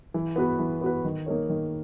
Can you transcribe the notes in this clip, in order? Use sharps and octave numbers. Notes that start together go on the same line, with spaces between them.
E3
B3 F#4 B4
E3
B3 F#4 B4
D#3
A#3 D#4 A#4 C#5
D#3